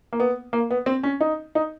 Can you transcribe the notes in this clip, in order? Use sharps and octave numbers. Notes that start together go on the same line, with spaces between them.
A#3
B3
A#3
B3
C4
C#4
D#4
D#4